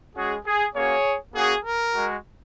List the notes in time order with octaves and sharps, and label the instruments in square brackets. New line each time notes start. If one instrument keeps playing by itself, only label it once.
[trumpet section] G#3 C#4 F#4 G#4
G#4
A#3 C#4 F#4 G#4 C#5
A#3 C#4 F#4 G#4
A#4
G#3 F#4